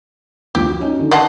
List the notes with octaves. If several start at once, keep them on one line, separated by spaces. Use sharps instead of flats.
D2 F3 G4
F#4
C#4 D#4 D#5
D3 D#3
D5 D#5 F#5 A5 C6 C7